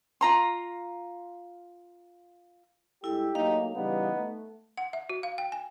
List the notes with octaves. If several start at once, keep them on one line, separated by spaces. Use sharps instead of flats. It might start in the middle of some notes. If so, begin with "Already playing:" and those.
F4 A#5 C6
G2 G#3 E4 G4 A4 E6
F#3 A3 A#3 D#4 F5
C#3 E3 G3 B3 D#4
A3
F#5
E5
F#4
F5
G5
G#5